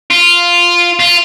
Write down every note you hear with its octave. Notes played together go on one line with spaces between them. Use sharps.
F4
F4